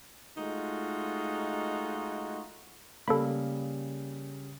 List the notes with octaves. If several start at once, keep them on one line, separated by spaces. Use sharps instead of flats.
G#3 A3 D#4 F4 F#4
C#3 G3 A#3 A4 B5